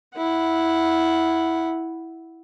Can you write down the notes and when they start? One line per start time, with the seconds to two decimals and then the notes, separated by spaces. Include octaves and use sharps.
0.17 E4 F#5